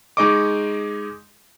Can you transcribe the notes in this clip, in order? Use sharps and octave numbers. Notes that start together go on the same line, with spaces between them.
G#3 D#4 G#4 D#5 C#6 D6